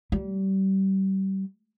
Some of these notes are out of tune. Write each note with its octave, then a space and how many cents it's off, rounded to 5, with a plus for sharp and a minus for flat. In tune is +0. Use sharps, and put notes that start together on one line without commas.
G3 -30